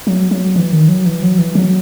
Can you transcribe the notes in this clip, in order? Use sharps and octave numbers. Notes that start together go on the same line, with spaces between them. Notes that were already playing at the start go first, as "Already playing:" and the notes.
F#3
F#3
E3
D#3
F#3
E3
F#3
E3
F#3